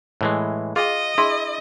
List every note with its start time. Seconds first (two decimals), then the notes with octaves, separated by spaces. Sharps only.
0.21 A2 E3 G#3
0.76 F4 G#4 D#5 G5
1.18 D4 E4 G#4 C6